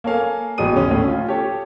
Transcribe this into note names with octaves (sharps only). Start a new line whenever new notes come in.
A#3 A4 C#5 F5 G#5
A1 B2 G#3 D5 D#6 D#7
D#2 C#3 C#4
D2 A2
C#4 F4
G4 A4 C#5